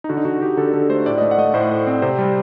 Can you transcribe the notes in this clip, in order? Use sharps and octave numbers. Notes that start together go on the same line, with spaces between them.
D#4
D3 F#4
D#4
D3 F#4
D3 G4
D3 A4
D3 A4
A3 C5
A2 D5
D#5
A3 D5
F#5
A3 D#5
A2 C5
A2
C4
C3 C5
G3